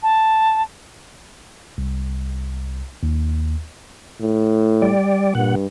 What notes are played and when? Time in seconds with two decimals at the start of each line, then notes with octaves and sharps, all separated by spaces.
0.03 A5
1.78 C2
3.03 D#2
4.21 A2
4.82 G3 D5
5.35 G2 A#2 F#5